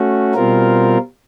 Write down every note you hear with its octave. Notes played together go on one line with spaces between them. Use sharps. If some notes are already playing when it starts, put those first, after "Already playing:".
Already playing: A3 C#4 F#4
B2 G3 C4 F4 A#4